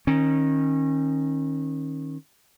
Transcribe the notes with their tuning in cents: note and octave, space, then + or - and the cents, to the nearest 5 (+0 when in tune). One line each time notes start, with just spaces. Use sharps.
D#3 +0 C#4 -30